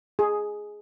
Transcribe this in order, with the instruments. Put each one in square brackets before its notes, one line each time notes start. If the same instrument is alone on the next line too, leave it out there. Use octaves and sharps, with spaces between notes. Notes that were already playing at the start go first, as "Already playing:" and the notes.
[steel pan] G#4